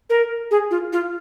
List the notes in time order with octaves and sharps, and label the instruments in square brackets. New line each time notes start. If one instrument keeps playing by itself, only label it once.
[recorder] A#4
G#4
F4
F4